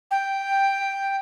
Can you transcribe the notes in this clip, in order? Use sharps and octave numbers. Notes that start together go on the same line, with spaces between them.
G5